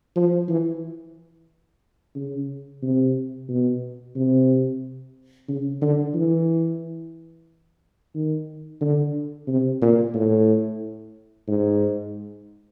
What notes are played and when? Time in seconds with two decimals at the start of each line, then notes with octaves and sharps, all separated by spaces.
0.16 F3
0.48 E3
2.15 C#3
2.82 C3
3.49 B2
4.16 C3
5.48 C#3
5.82 D3
6.15 E3
8.15 D#3
8.81 D3
9.47 C3
9.82 A#2
10.14 A2
11.48 G#2